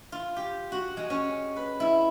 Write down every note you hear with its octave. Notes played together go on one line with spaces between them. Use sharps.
F4
G4
F#4
G#3
C#4
B4
E4